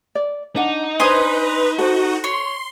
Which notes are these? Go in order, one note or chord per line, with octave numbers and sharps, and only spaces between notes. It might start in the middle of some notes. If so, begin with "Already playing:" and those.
D5
D4 D#4 F#5
D4 B4 C5 G#5 C6 D#6
F#4 A4 C5
C#5 C6